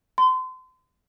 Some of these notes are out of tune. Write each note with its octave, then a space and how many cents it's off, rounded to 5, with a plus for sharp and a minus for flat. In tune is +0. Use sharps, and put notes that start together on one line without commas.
C6 -35